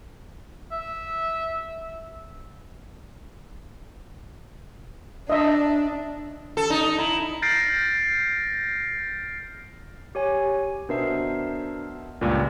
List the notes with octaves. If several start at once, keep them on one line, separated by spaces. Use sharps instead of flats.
E5
D4 D#5 E5
A4
D#4
E4
F6 G6 A6 A#6 C7 D7
G4 C#5 G#5
B2 D4 A#4 C5 E5 C7
C#2 G2 A#2 D5